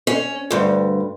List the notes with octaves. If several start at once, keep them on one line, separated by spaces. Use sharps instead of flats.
C#4
D2 G2